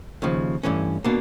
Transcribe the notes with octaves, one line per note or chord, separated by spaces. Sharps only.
D#2 C#3 F3
G2 E3 A3 C#4
B2 A#3 D4